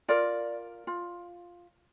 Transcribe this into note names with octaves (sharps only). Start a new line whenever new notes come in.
F4 A#4 D5
F4